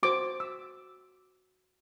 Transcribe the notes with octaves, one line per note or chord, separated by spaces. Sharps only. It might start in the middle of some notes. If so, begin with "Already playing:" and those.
F#4 C5 D6
E6